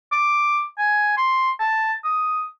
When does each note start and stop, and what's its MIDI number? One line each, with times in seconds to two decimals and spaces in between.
0.12 0.64 86
0.78 1.14 80
1.17 1.51 84
1.59 1.93 81
2.05 2.46 87